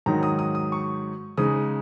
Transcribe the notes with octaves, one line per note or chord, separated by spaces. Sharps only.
G#2 D#3 F#3 D#4 A#5
D#6
D#6
D#6
C#6
C#3 G#3 D#4 D#6